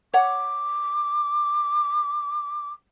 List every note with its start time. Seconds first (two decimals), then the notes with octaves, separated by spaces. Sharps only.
0.14 C#5 F#5 D6